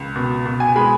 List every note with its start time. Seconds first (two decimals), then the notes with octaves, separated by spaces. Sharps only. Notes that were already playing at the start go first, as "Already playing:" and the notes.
Already playing: C#2
0.16 B2
0.46 B2
0.60 G#5
0.76 G#3 B5